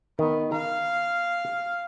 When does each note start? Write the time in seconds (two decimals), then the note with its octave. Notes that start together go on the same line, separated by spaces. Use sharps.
0.19 D#3 B3
0.52 F5 A#5